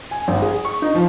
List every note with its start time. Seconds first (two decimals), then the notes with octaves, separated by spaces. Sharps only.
0.11 G#5
0.28 G#1
0.42 G#4
0.65 C#6
0.82 D#4
0.95 F3